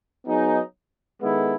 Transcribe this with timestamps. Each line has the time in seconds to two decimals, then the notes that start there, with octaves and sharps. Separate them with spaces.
0.25 F#3 B3 D#4 G#4
1.21 D#3 G#3 B3 E4 A4